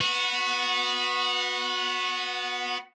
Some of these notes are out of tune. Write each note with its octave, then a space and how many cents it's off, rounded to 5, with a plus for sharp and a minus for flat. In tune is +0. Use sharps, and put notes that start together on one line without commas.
B3 +0 F#4 -25